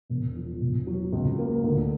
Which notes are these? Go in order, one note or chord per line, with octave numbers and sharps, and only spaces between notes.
E1
F3
E1
F#3
C#2
A#3
D2